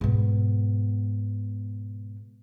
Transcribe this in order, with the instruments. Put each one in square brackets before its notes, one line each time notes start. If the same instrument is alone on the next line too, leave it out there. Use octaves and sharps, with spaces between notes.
[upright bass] G#2 B2